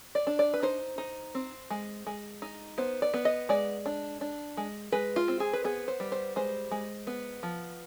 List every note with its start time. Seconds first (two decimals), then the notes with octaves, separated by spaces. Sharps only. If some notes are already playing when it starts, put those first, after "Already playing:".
0.15 D5
0.27 D4
0.39 D5
0.54 B4
0.63 D#4 C5
0.98 D#4
1.35 C4
1.70 G#3
2.07 G#3
2.42 D#4
2.78 B3 C5
3.02 D5
3.14 B3
3.25 D#5
3.49 G#3 D5
3.86 D4
4.21 D4
4.57 G#3
4.92 G#3 B4
5.16 F4
5.28 C4
5.40 G#4
5.53 B4
5.64 B3 G#4
5.88 C5
6.00 G3
6.12 C5
6.36 G#3 C5
6.71 G#3
7.07 B3
7.43 F3